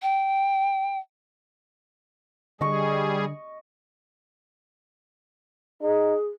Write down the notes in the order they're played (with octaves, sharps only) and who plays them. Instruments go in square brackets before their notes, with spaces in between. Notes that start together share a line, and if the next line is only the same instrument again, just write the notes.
[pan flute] G5
[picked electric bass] D3 [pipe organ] G3 G#4 [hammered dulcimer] D#5 C#6
[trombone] D#4 [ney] G#4